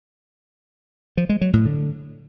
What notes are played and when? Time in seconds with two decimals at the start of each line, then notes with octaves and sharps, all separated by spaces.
1.17 F3
1.29 G#3
1.41 F#3
1.53 A2
1.65 D3